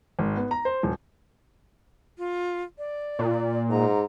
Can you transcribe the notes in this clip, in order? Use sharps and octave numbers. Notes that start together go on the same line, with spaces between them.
G#1
B3
A#5
C5
D#1
F4
D5
A#2
G#2 A#5